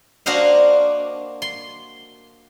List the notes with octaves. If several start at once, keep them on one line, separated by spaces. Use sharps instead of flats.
A#3 D4 F#4 C5 D#5 F5
C6